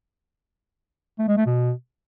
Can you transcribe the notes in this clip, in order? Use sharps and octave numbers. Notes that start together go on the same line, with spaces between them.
A3
G#3
A3
B2